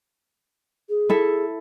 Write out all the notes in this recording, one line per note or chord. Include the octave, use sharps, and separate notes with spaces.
G#4
E4 A4 E5